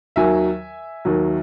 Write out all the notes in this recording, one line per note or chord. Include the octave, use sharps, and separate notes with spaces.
D#2 D#3 F#3 E5 G#5
D#2 D#3 F#3